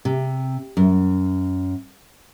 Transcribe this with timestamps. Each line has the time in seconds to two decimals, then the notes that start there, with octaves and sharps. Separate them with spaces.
0.05 C3
0.77 F#2